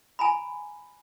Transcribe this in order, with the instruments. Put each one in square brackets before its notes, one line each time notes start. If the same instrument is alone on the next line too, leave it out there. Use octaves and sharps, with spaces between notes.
[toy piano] G#5 A#5 B5